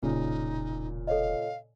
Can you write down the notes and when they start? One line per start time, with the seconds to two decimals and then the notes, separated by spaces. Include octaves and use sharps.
0.03 E1 A#2 C#3 D#4
1.07 A4 C#5 D#5 F5